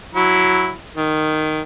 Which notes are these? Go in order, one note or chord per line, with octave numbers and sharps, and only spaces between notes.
F#3 E4
D#3